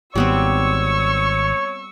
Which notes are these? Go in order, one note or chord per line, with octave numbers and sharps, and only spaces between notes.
G#1 G3 B3 C4 C#5 C#6 E6